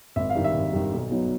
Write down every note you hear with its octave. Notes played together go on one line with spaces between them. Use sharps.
G#1 E5
F5
G2 D#3 G3
E5
G#1
G2 D#3 G3
B1
B2 F#3 B3 D#4